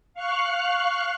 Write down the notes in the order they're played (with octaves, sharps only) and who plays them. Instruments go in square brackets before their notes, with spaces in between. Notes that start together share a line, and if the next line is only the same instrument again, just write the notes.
[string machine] F5 C#6 F6 F#6